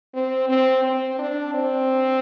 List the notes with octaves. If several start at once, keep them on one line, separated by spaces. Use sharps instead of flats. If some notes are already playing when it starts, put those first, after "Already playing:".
C4
C4
C4
D4
C4